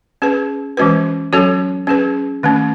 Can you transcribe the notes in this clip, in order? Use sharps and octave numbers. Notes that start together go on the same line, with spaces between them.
C#4 G#4 B4
E3 G#3 C#4 F#4 B4
F#3 C#4 F#4 A4 C#5
C#4 G#4 B4
D#3 A3 C#4